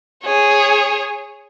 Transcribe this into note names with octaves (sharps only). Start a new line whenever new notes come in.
G#4 C#5